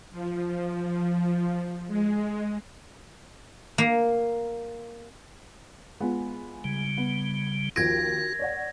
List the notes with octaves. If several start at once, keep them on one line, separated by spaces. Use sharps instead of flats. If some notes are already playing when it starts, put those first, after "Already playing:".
F3
G#3
A#3
G#3 B3 F4
C#3 G3
B3
D#2 F3 F#4 G#6 A#6 D7
C#5 D5 F#5